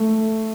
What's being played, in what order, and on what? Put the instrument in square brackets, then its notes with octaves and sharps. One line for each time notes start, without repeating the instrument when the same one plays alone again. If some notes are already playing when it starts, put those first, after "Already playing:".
Already playing: [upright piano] A3